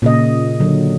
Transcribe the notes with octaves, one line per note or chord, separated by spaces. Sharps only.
A#2 C#3 D#5
D3 F#3